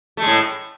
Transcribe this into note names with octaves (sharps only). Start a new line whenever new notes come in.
A2 G#3 A3